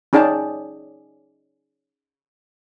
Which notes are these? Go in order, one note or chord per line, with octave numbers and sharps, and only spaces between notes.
C#4 D#4 G#4 D5 G5 A5